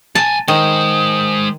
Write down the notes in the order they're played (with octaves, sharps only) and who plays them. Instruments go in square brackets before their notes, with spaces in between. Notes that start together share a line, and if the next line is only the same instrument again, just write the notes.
[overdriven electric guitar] B1 G#5 [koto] A5
[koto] D#3 [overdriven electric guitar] G#3 C5 [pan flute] D#6